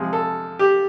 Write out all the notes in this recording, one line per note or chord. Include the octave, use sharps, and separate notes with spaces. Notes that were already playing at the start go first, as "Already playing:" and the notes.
Already playing: C3 F3 G#3
A4
G4